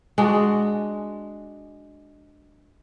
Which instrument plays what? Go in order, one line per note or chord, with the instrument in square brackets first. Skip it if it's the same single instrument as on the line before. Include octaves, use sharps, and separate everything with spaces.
[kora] G#3 D4 F#4